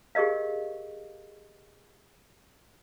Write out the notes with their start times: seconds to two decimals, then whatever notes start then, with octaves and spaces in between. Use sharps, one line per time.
0.15 G4 G#4 A#4 D#5 F5